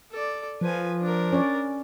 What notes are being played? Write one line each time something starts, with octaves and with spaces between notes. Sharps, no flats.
A4 D5
F3 B4 G#5
D4 A#4
C#4 C#5 D5